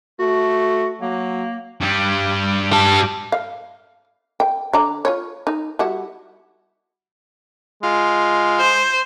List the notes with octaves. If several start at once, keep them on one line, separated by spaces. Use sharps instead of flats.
A3 F#4
F#3 A#3
G2 G3
G4 A5
F5
G5
D3 D5 A#5
F4 C#5
D#4
G3 E4 F#4
G#3 F4
C5